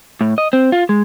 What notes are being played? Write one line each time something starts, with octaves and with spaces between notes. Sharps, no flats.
A2
D#5
C4
F4
G#3